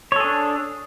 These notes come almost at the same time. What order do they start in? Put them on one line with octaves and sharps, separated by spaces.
C#5 A4 G#4 D4